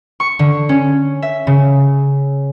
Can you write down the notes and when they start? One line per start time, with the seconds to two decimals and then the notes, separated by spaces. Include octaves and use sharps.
0.20 C#6
0.39 D3
0.69 C#4
1.22 E5
1.47 C#3